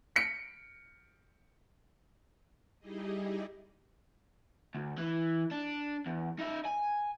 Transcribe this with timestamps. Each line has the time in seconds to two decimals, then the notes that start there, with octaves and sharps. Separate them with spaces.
0.16 B6 C#7 D7
2.80 G3 D#4 E4 G4 G#4 D#5
4.75 D2
4.98 E3
5.51 D4
6.06 E2
6.39 D#4 E5
6.65 G#5